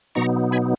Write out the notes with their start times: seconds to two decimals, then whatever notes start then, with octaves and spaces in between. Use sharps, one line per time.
0.15 B2 F#3 B3 D#4 A#5 C#6
0.52 G#5 B5